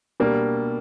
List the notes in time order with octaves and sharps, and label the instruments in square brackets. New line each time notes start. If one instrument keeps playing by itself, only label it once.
[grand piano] B2 G3 A#3 D4